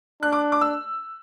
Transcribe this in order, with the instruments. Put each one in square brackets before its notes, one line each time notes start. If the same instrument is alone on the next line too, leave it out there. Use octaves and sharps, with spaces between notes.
[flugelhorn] D4 [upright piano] F#6
[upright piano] D6
D6
E6